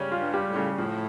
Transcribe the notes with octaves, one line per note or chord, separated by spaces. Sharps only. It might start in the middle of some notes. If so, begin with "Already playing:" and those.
Already playing: C#3 G3 C#4
F4
G2
G3
A2
C#3
A2 F3